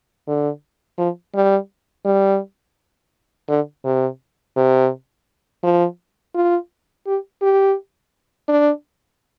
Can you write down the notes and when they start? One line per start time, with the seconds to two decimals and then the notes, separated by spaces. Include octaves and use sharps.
0.28 D3
0.98 F3
1.35 G3
2.05 G3
3.49 D3
3.85 C3
4.56 C3
5.63 F3
6.35 F4
7.06 G4
7.42 G4
8.48 D4